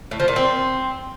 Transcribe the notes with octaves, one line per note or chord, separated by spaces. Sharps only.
A2
F3
A#2
C4